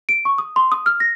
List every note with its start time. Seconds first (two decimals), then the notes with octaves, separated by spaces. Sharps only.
0.09 D7
0.25 C#6
0.38 D#6
0.56 C6
0.72 D#6
0.86 F6
1.00 A#6